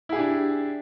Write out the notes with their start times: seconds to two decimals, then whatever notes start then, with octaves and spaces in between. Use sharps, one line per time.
0.09 E4
0.12 G#4
0.16 G4
0.19 D4